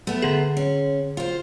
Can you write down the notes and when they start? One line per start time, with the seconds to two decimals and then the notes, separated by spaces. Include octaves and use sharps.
0.07 A3 B3
0.22 D3 G#4
0.57 C#4
1.17 F4 C5